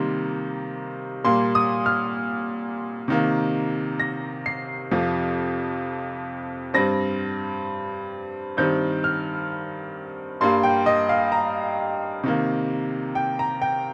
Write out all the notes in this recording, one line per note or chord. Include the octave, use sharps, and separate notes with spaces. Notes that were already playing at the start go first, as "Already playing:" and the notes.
Already playing: C3 D#3 G3 A#3 C6
A#2 G3 A#3 C6
D#6
F6
C3 D#3 A#3
A#6
C7
F2 C3 F3
G2 G3 C4 A#6
G2 D#3 G3 C4 G6
F6
G2 G3 A#3 C6
G5
D#5
F5
A#5
C3 D#3 A#3
G5
A#5
G5